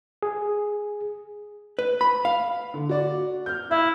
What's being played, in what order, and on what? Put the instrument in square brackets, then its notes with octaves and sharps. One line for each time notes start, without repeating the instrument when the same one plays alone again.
[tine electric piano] G#4
[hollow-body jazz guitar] B4
B5
F5
[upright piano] D3
F#4 D5
F6 G6
[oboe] E4 [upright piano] E5